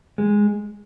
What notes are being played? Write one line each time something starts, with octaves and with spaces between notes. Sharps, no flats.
G#3